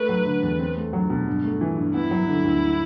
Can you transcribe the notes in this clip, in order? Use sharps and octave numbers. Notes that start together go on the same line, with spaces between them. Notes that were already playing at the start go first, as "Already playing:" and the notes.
Already playing: A3 B4
F#3
D3
E2
C4
A3
F#3
B2
G2
A3
E3
G2
B3 E4
F#3
D3
D2